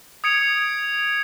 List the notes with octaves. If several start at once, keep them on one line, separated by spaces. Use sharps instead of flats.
D#6 G#6 C#7 D7 F7